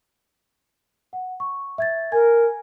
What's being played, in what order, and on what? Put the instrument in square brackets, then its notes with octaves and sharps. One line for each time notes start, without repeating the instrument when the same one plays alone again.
[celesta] F#5
C#6
E5 G#6 A6
[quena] A#4 [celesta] G#5 G#6